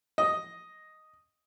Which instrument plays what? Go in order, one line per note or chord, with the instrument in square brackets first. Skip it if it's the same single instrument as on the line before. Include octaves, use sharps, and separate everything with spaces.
[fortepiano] D#5